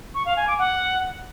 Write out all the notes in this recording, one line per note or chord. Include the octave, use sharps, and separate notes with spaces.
C#6
F5
G#5
D6
F#5